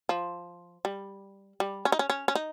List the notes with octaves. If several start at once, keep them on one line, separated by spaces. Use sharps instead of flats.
F3
G3
G3
C#4
D#4
C#4
C#4
C#4
D#4